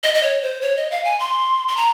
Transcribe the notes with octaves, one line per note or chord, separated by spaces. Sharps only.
D#5
D#5
C#5
C5
C#5
D#5
F5
G#5
C6
C6
A#5